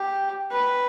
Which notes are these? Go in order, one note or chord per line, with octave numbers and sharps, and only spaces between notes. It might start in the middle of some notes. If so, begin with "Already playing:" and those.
Already playing: G4
B4